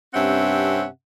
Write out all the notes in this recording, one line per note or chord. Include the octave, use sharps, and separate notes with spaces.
G2 C3 C4 C#4 E5 F#5